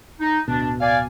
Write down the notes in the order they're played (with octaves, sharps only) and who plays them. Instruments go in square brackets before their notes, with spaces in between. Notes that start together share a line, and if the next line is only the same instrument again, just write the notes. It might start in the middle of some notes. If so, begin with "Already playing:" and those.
[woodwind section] D#4
[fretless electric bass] D1 B2 [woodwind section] D4
[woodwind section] D5 F5 G#5